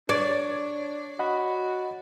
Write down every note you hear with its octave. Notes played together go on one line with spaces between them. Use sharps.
D4 C#5 D5
F#4 D#5 F#5 B5